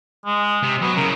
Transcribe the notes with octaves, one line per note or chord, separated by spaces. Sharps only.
G#3
C3
F#3 B3
C#3 E4 A#4